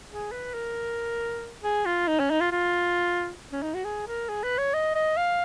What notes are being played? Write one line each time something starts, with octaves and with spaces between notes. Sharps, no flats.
G#4
B4
A#4
G#4
F4
D#4
C#4
D#4
F4
F4
C#4
D#4
F#4
G#4
A#4
G#4
B4
C#5
D#5
D#5
F5